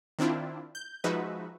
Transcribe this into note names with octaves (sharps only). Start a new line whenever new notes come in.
D#3 C4 D4 E4 F4
G6
F3 G#3 D#4 F#4 B4 E5